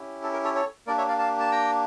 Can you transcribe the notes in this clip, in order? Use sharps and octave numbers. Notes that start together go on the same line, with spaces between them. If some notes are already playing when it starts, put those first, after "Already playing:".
Already playing: C#4 E4 G4
A4
A#4
A4 C#5
A4 C#5
A#3 D4 G4 A#4 D5
C#5 E5
D5 F5
F5 A5
A5
G5 A#5